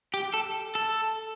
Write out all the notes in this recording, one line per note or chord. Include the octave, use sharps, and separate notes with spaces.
G4
A4
A4